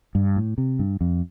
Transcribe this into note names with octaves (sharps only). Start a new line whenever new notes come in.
G2
A2
C3
G2
F2